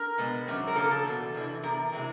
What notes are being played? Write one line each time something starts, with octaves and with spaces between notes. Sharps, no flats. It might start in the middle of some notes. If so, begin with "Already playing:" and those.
Already playing: A#4
B2 G#3 B3
F#2 D#3 G3 C4
A#4
C#3 F3 A#3 A4
A4
E2 B2 G3
F2 C3 E3
E2 C3 A#4
C3 E3 G#3 C4